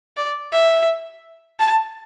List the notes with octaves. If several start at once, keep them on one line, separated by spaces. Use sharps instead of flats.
D5
E5
A5